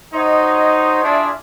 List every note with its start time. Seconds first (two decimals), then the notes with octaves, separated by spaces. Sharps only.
0.13 D#4 F#4 C5 C#5 D#5
1.02 D4 E4 F4 G#4 D5 E5